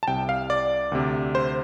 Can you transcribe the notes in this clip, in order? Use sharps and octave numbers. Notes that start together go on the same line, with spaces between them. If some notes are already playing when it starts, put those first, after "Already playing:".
A5
C2 C3 G5
F5
D5
D2 C3
C5